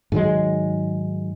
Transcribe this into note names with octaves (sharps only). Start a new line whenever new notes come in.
G#2 D#3 F#3 G#3